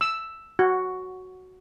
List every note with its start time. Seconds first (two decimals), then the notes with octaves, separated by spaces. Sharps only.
0.01 E6
0.59 F#4